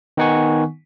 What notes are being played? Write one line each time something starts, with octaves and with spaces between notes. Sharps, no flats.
D#3 B3 D#4 F#5 G#5 C#6